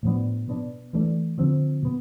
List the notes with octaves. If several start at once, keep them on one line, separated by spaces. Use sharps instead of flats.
A2 F3 B3 D4
B2 B3 D4
E3 A3 D4
D3 F3 C4
B2 B3